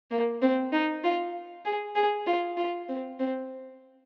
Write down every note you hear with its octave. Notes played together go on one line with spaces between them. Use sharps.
A#3
C4
D#4
F4
G#4
G#4
F4
F4
C4
C4